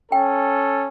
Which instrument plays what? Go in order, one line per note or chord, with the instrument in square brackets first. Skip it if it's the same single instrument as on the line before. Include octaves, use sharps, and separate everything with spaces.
[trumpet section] C#4 A4 [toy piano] G5